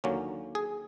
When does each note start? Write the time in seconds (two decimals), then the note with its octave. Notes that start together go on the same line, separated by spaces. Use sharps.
0.04 D#2 D3 F#3 A#3 C#4
0.55 G#4